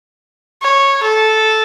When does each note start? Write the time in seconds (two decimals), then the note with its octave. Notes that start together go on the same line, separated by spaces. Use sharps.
0.62 C#5
1.03 A4